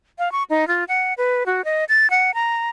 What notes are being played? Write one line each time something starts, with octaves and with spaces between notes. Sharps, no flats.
F5
C#6
D#4
F4
F#5
B4
F#4
D#5
A6
F#5
A#5